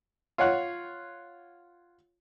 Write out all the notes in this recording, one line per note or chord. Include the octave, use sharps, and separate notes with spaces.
F4 C#5 F#5